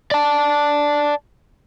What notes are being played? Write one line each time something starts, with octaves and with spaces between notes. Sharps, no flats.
D5 A5